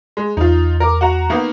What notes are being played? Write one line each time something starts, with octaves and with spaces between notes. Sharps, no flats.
G#3
E2 D#4 F4
A#4 D6
F#4 F#5 A#5
D#3 A#3 B3